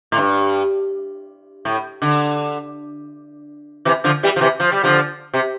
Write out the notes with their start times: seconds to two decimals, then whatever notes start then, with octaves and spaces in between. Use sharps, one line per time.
0.12 A2
0.17 G2
1.65 A2
2.02 D3
3.85 C3 E3
4.04 D3 F3
4.23 E3 G3
4.36 F3
4.41 C3 E3
4.60 F3
4.72 G3
4.84 D3 F3
5.34 C3